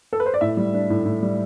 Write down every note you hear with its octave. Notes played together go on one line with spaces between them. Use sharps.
A4
B4
C5
D5
A2 E5
G3
D4
A2
A2
G3